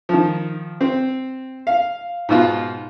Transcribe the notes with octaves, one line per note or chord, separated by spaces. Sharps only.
D#3 F3
C4
F5
G#2 B2 F4